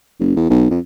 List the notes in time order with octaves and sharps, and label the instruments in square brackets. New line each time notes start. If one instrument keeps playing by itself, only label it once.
[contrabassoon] F#1
E2
B1
F2